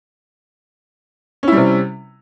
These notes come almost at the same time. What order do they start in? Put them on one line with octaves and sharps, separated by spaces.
C#4 E4 G3 C3